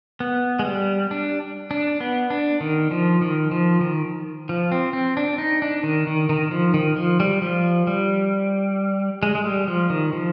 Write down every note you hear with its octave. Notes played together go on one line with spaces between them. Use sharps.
B3
G#3
G3
D4
D4
B3
D4
D#3
F3
D#3
F3
D#3
F3
C4
C4
D4
D#4
D4
D#3
D#3
D#3
F3
D#3
F3
G3
F3
G3
G#3
G#3
G3
F3
D#3
F3